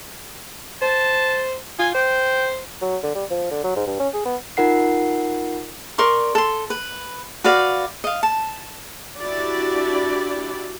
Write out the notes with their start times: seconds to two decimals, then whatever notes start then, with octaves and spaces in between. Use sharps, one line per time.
0.82 C5 A5
1.79 F4 G#5
1.94 C5 G5
2.82 F#3
3.03 D3
3.15 G3
3.30 F3
3.51 D3
3.64 F#3
3.76 G#2
3.87 G2
4.00 C#4
4.14 G#4
4.25 B3
4.57 D#4 F4 A#4 F#5 C7
5.98 A#4 D5 C6 C#6
6.35 A4 C6
6.70 B4
7.44 F#4 B4 D5 F5
8.04 D#5 F5
8.23 A5
9.21 D4 E4 F#4 G4 D5